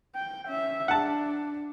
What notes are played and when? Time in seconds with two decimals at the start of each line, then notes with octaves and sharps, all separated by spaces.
0.16 G5
0.46 C#4 E5
0.88 D4 F#5 A5